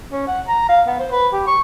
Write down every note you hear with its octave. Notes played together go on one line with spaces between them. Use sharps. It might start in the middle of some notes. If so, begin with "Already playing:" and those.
C#4
F#5
A#5
F5
B3
C5
B4
G4
C#6